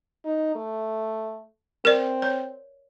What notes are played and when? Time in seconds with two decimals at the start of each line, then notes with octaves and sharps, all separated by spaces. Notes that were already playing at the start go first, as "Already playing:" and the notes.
0.25 D#4
0.55 A3
1.85 C4 A#4 D5
2.22 C#5